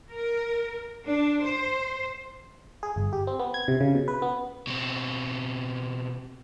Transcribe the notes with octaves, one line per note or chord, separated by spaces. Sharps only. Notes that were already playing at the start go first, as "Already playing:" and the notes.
A#4
D4
C5
G#4
G1
G4
C4
B3
G#6
C3
C#3
B2
B4
B3
B2 C4